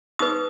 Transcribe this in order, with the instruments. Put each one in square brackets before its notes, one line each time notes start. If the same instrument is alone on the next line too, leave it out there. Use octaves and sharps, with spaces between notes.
[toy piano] D#4 G#4 B4 D#6